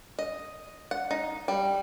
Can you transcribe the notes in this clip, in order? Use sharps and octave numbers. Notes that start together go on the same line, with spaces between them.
D#5
F#5
D#4
G3